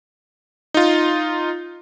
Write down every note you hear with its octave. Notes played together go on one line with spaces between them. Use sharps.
D#4 F4